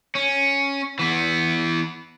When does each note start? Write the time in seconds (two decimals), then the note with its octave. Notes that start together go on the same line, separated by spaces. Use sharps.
0.15 C#4
0.99 E3 B3